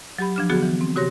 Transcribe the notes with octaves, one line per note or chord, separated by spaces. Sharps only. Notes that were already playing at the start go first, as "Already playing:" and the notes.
F#3 G4 B5
F3 D4 F6
D3 F#3 B3 F#4 G#4
E3
C4
C3 F#4 G4 C#5 C6 A#6